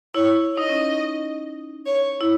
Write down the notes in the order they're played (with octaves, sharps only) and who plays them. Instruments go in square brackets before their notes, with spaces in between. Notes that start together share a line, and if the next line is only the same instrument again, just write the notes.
[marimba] E4 [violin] C#5
[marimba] D#4 [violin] D#5
[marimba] C#4
D#4
[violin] C#5
[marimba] E4